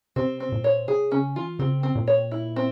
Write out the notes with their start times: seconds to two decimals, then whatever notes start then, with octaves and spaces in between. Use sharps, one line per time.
0.16 C3 C4
0.40 C4
0.52 A#2
0.64 C#5
0.87 C3 G#4
1.12 C#3 C#4
1.36 E3 F4
1.59 C#3 C4
1.83 C4
1.95 A#2
2.08 C#5
2.31 E4
2.56 C4